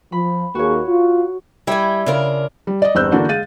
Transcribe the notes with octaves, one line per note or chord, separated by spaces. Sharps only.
F3 B5
D#2 A#3 F#4 G#4 C#5
F4
G3 E4 G5 G#5
C#3 D4 F4 A#4
G3
D5 D#5
G1 E2 C4 E6 F#6 G6
D3 E3 A#3 D4 F#4
G#3 F5 A6 D#7